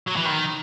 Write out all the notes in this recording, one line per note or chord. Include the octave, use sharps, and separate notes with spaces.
F#3
E3
D#3